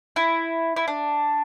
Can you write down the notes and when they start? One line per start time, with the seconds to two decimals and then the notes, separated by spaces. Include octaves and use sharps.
0.16 E4
0.76 E4
0.88 D4